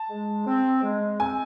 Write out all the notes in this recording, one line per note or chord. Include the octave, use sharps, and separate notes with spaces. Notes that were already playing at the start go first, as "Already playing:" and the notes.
Already playing: A5
G#3
C4
G#3
C4 G#5